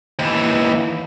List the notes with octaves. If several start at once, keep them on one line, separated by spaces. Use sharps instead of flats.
D#2 E3